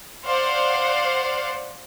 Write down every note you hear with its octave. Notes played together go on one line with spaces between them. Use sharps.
C5 D5 F5 F#5